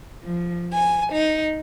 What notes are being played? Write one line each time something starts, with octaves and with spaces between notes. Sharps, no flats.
F3
G#5
D#4